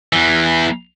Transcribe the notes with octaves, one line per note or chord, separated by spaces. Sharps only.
E2 E3